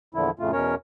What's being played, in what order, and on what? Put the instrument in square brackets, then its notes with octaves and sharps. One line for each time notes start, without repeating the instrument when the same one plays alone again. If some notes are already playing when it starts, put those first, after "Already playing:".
[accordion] E2 A#2 D3 F3 E4
F2 A2 C#3 A3 F4
E2 B2 C#4 A#4 C#5